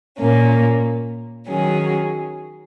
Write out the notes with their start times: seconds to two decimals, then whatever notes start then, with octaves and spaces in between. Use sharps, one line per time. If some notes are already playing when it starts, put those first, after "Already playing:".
0.17 A#2 A#3 C#4
1.47 D#3 F#3 C#4 G#4